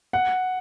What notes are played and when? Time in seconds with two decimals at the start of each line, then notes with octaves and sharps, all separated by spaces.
0.13 F#5